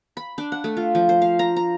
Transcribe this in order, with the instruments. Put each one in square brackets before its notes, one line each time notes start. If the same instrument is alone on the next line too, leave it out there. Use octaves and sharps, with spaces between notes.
[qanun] B5
D4
F#5
A3
F4
F3
C5
F5
A#5
A#5